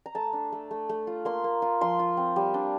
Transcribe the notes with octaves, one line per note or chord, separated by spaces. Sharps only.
A#5
A3 A5
D4
A3
A3
A3
F4
A#3 C6
A#3
F4
F3 C6
F4
C4
G3
D4